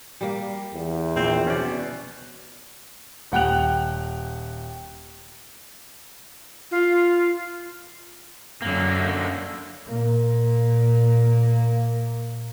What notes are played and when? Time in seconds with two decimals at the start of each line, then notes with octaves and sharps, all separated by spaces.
0.21 G3 A#3
0.74 E2
1.16 A#1 C4
1.47 B2 C#4 D5
3.32 D#1 F#5 G5 F#6 F7
6.71 F4
8.62 F#2 D3 A#3
9.88 A#2 A#3